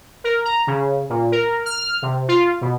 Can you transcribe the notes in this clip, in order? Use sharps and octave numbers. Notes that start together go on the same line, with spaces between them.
A#4
A#5
C#3
A#2
A#4
F6
C3
F4
B2